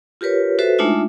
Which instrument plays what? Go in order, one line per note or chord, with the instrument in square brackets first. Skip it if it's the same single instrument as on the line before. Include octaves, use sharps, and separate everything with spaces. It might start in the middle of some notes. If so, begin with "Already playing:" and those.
[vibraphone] F4 G4 A#4 B4 C#5
F#4 A4 B4 C5 E5
G#3 A3 D4 D#4 F4 E5